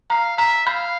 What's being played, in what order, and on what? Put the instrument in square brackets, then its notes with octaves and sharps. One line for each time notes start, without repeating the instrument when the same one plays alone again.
[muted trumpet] F5 [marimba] A#5
[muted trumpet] E5 [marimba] A#5
[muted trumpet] F5 [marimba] B5